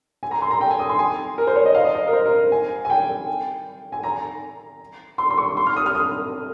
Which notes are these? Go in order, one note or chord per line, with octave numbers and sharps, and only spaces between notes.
G#5
A#5
C6
A#5
G5
G#5
D#6
C6
G#5
A#4
C5
C#5
D#5
F5
D#5
D#5
A#4
C5
A#4
G#5
G#5
G5
G#5
A#5
C6
C6
C#6
C6
F6
D#6
F6
D#6